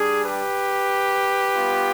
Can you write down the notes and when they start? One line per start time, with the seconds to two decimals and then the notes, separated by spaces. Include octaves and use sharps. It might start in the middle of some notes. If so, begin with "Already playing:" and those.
Already playing: G3 D4 G#4
0.24 G4 B4
1.55 G3 B3 F4